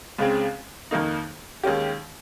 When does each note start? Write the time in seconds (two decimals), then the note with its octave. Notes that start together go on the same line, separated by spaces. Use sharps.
0.19 C#2 C#3 G#3 C4
0.91 F2 D#3 A#3 D#4
1.63 D#2 D#3 G#3 C#4 G4